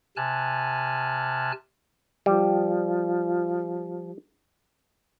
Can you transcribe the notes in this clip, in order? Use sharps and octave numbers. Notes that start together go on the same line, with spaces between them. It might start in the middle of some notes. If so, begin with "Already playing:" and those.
C3 G#5 A5 F6 F#6
F3 G3